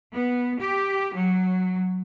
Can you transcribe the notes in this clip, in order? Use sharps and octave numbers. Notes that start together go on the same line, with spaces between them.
B3
G4
F#3